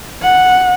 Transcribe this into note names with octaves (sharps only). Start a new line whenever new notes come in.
F#5